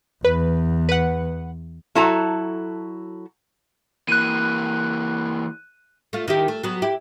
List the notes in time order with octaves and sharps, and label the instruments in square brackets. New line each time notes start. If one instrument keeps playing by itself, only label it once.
[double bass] E2 [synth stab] B4
[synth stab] B4 F#5
[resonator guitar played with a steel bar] F#3 E4 F#4 A4 A5 A#5
[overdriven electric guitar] E3 A#3 [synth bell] F#6 D#7
[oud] A3 F4
D#3 E4 G4
A3
F#3 B3
E4 G4